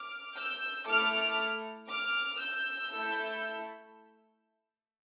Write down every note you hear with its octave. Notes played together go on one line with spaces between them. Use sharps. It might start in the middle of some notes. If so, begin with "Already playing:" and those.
Already playing: D6 F6
E6 G6
A3 E4 A4 D6 F6
D6 F6
E6 G6
A3 E4 A4